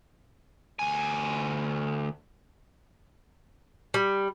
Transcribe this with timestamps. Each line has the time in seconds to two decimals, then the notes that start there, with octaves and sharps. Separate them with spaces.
0.79 D2 G#5
3.94 G3